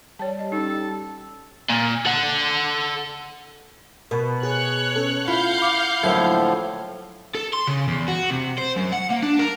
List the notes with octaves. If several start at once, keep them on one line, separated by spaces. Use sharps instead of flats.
G3 C#5 A5
D#5
C#4 D#4 A4
A#2
A4 F#5
B2 A#4
G#4 C#5 F#6
C#4 A4
E4 F4 F5 F#5 G6
B5 D6
A2 D3 F3 F#3 A#3 E4 E5 G#6
A4
C6
C#3
E2
F#4
C3
C5
F#2
F#5
A#3
D4
A#4